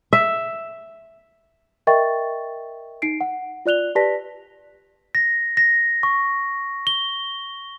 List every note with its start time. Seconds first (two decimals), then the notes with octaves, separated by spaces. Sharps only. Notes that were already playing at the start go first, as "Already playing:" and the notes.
0.13 E5
1.87 A#4 D#5 E5 G5 C#6 A6
3.02 D#4 C7 D7
3.21 F#5
3.66 F4 D5 F#6 F7 G7
3.95 G4 B4 D5 A5 A#6 B6
5.15 A#6
5.57 A#6
6.03 C#6
6.87 G7